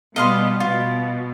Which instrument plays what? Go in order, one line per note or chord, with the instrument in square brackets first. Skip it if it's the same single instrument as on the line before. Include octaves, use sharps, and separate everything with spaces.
[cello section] B2 G3 B3 [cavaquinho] D#5 F5 C6
[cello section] B2 [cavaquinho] F4